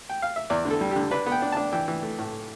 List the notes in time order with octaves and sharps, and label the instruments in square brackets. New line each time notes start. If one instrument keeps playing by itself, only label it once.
[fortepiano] G5
F5
E5
E2 D5
D3
A4
G3
D3 G4
D4 B4
B3
G5
D4
D4 A5
E3 G5
E3
A3
A2